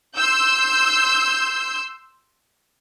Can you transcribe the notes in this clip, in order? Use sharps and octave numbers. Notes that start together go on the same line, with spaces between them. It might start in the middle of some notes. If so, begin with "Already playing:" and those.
C6 E6 G6